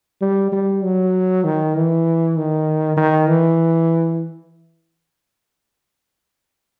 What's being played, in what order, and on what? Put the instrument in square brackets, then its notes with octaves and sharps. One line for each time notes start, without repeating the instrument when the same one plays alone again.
[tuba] G3
G3
F#3
D#3
E3
D#3
D#3
E3